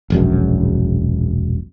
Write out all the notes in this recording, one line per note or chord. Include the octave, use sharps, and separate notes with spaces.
E1 A#1 F#2